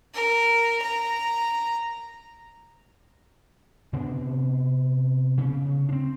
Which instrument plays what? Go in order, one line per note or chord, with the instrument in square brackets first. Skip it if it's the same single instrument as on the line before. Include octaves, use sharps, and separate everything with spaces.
[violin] A#4
A#5
[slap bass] C3 B3 D4
C#3 C4 C#4
C4 D4